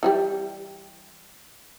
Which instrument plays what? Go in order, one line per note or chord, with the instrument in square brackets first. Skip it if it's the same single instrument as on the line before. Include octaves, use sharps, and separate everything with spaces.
[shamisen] E3 F#3 G3